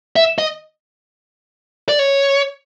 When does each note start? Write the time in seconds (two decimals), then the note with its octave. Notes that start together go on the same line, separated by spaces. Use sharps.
0.16 E5
0.38 D#5
1.89 D5
1.99 C#5